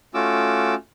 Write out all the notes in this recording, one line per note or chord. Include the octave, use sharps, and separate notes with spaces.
A3 C#4 F4 F#4 D6 E6